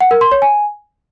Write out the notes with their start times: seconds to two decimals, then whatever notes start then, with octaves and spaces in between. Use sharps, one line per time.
0.01 F#5
0.11 A#4
0.21 C6
0.32 C#5
0.42 G#5